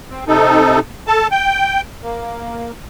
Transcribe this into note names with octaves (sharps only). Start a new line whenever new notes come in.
C4
C3 D#4 A4
A4 A5
G5
A#3